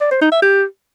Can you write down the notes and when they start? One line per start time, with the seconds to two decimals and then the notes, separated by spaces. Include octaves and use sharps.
0.01 D5
0.11 C5
0.21 D#4
0.32 E5
0.42 G4